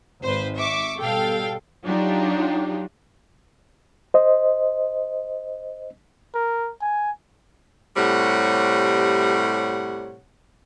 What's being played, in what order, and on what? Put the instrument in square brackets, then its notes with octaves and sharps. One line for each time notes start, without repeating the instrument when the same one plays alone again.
[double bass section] G#1 [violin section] B4 C5
[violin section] E5 C#6 D6
[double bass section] B2 G3 [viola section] A4 [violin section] F5 G5
[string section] F#3 D4 D#4 F4 G4
[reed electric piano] C5 D#5
[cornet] A#4
G#5
[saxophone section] A2 C3 G3 C#5 F#5